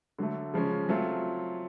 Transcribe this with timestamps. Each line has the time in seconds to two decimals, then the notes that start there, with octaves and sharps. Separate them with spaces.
0.19 D3 F#3 A3
0.54 C#3 F3 G#3 C#4
0.89 F#3 A3 C4 F4